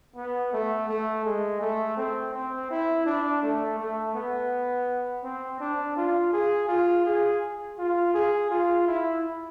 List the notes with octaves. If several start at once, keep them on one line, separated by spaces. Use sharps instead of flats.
B3
A3
A3
G#3
A3
C4
C4
E4
D4
A3
A3
B3
C4
D4
F4
G#4
F4
G#4
F4
G#4
F4
E4